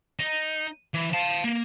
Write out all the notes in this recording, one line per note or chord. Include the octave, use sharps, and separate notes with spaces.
D#4
E3
F5 A5
A#3